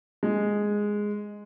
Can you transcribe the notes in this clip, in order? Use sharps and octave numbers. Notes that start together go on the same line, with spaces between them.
G#3